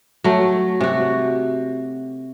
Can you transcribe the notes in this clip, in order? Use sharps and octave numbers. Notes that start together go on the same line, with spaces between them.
F#3 A3
C3 F#4